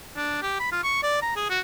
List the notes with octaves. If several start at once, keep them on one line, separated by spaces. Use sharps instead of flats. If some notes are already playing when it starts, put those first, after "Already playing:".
D4
G4
B5
F4
C#6
D5
A#5
G#4
F#4